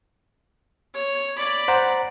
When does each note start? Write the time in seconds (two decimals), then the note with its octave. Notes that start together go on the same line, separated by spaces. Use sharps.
0.94 C#5
1.36 D5 B5
1.68 C5 F#5 A#5